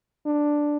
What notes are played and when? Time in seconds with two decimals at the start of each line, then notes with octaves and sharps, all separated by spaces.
0.26 D4